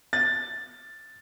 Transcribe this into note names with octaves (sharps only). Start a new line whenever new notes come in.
A6